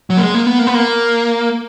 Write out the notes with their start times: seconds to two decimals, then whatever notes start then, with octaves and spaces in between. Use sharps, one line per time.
0.10 F#3
0.17 A#3
0.22 G#3
0.34 A#3
0.46 B3
0.59 A#3
0.67 B3
0.75 A#3